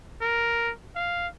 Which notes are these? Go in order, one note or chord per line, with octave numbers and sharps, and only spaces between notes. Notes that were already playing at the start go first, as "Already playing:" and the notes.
A#4
F5